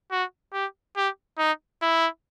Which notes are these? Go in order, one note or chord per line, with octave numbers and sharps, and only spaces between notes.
F#4
G4
G4
D#4
E4